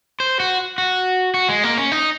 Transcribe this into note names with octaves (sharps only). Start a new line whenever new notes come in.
C5
F#4
F#4
F#4
G#3
A#3
C#4
D#4